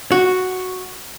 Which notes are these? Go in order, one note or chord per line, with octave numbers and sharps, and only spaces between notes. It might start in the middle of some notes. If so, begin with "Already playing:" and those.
F#4